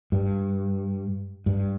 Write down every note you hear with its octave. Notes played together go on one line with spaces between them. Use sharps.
G2
G2